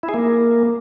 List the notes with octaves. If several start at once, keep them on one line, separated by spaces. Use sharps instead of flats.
E4
G#4
A#3